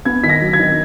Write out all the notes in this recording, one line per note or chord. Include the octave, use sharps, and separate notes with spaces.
B3 G#6
D#3 B6
A#6
F#3
G#6
D#3